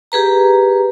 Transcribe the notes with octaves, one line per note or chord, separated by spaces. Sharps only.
G4 G#4 B4 A#5